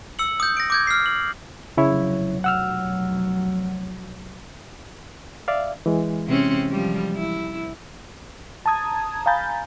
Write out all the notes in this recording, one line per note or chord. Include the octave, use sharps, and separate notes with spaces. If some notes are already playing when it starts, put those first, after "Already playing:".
E6 C#7 F#7
D#6 G6
A#6 D7
D6 G6 G#6
F6 C7
F#7
F1 B1 C#3 F#3 E4 C#5
F#5 E6 F6
D5 E5 F5
E3 G#3
C3 C4 C#4
F3 G3
E4
A5 A#5 D#6 G#6
F5 G#5 A#5 B5 G6 A6